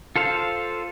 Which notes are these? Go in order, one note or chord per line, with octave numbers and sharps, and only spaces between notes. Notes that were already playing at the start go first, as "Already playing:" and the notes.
F4 A4 C5 F5